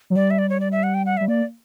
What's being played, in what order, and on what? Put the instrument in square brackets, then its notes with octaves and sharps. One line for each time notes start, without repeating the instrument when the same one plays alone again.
[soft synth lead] F#3
[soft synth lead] G3 [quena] D5
[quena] E5
D5
C#5
D5
E5
F#5
G5
F#5
E5
[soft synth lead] G3
[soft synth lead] A#3 [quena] D5